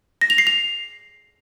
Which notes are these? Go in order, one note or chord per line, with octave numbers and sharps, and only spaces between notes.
A#6
F7
C7
F7